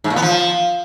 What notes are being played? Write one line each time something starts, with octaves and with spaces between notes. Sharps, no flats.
G#2
A#2
B3
F3